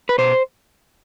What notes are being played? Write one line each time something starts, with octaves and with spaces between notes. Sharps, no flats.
B4
B2 C5